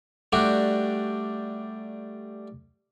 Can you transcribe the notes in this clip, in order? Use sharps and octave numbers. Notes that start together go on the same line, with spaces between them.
G3 A3 D4 F#4 G4